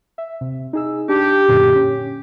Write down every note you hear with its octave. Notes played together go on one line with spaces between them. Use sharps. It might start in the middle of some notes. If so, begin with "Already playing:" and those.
E5
C3
D#4 G#4 E6
D4 G4 A5
F#2 A#2 D3
C#4